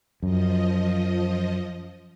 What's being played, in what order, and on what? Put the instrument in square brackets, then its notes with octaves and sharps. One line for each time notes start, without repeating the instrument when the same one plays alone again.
[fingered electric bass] F#2 [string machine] F3 D#5